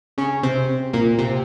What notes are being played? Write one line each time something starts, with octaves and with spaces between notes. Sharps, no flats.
C#3 C#4
C3 C4
A#2 A#3
C3 C4